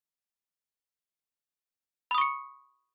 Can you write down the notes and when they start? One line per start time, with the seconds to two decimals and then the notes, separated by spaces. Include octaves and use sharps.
2.11 B5
2.14 D#6
2.18 C#6
2.21 C#7